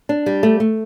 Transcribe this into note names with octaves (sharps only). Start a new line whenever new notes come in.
D4
G3
A3
A3